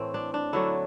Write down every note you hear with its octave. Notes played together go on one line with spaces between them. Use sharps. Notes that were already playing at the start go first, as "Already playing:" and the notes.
Already playing: A2 E3 A3 C4
D4
D4
D3 F#3 A3 E4